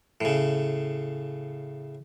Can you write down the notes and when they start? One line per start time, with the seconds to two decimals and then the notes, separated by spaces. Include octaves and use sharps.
0.21 A2 C#3